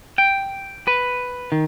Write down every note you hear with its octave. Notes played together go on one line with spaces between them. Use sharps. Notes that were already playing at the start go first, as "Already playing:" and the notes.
G5
B4
D#3